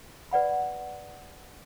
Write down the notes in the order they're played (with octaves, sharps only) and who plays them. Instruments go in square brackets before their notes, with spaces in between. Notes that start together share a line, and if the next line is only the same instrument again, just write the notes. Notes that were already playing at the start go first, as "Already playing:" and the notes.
[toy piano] B4 D5 F#5 B5